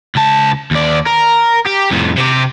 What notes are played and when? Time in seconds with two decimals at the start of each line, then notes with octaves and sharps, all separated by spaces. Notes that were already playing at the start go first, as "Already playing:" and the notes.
0.16 C#2 A5
0.71 D#2 D5
1.07 A#4
1.66 G4
1.91 F2 A2
2.17 C3 G4